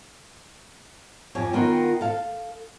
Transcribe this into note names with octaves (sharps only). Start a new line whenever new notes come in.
F2 G4 C#5 G#5
D#3 B3 F4 F#4 A#4 G5
A4 F5